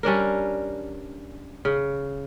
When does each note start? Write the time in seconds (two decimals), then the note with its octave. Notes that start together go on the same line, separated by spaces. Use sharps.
0.03 G3 C#4 D4 A#4
1.65 C#3